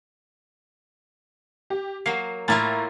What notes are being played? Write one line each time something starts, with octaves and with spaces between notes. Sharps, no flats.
G4
F#3 A#3 C7
A2 A#3 E4 F4 A#5 A6